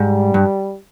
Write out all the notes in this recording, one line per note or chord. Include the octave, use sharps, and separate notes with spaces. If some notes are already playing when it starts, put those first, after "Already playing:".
Already playing: G#2 G3
G2